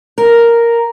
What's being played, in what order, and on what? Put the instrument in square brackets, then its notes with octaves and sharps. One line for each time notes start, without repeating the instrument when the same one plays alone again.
[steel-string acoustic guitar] A#4